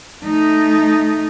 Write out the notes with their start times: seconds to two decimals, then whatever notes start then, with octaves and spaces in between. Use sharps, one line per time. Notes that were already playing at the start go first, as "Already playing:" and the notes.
0.24 A3 D#4